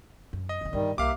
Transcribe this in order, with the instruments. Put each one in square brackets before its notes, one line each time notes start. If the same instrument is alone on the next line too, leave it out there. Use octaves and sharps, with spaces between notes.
[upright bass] F#2
[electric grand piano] D#5
[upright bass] C2 F3
[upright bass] G2 D4 [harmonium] D#3 G3
[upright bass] C2 [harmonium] A#3 G4 E5 [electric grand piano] F5 D6